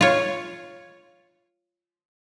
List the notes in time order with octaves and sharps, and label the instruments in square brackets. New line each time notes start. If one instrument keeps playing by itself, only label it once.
[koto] F4 C#5